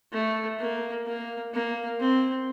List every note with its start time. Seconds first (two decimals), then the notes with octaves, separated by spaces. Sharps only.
0.12 A3
0.59 A#3
1.06 A#3
1.53 A#3
2.00 C4